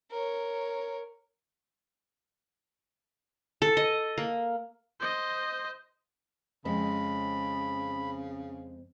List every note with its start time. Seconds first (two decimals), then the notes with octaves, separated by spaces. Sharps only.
0.11 A#4 C#5
3.62 A4
3.77 D#5
4.18 A#3
5.00 C5 D#5
6.65 F2 C#3 G#3 C4 B5